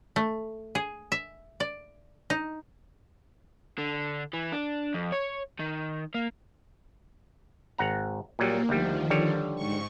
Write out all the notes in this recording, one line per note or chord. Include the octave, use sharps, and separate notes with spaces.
A3
G#4
E5
D5
D#4
D3
E3
D4
F2
C#5
D#3
A#3
G#1 F#5 A#5
A#2 F#3 G3 A#3
D2 D#3 F3 G3
D3 G3 C#5
G#2 C#6